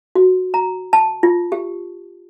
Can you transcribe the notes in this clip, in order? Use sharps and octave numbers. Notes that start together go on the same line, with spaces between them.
F#4
A#5
A5
F4
G4